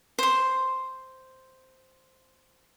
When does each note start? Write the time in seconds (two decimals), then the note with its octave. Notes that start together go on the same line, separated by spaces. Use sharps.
0.19 C5 C6